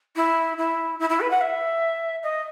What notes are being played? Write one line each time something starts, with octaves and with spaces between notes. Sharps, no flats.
E4
E4
E4
E4
B4
F#5
E5
D#5